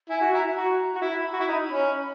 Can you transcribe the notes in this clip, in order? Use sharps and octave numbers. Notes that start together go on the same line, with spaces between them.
E4 G#5
F#4
E4 A#5
F#4 A#5
F#4
E4 B5
F#4
E4
D#4
C#4